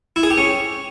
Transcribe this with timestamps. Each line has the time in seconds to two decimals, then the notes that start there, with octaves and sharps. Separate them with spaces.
0.16 E4
0.23 G#4
0.30 G4
0.38 C#4